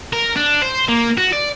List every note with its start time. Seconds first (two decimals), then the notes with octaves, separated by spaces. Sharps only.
0.13 A#4
0.36 D4
0.62 C5
0.89 A#3
1.18 F#4
1.33 D5